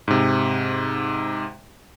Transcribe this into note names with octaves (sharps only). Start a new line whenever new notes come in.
G#2 C3